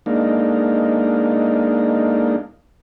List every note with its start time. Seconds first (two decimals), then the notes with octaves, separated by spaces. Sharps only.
0.06 G#3 A#3 D4 D#4